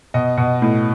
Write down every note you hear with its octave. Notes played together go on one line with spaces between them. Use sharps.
B2 D#5
B2
A2